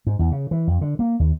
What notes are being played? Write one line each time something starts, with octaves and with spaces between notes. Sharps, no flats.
G#2
E2
C#3
E3
F2
D3
A#3
D#2